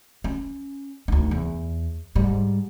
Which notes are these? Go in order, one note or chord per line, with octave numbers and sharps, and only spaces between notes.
C#4
D2 D#4
E2
G#2 G3